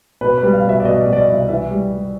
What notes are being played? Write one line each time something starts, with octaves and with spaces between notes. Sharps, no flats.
B2 B4
G3 B4
F5
B2
E5
D5
B2 D#5
D5
B2
D5
D#5
C2
E5
E3 E5
G3
G3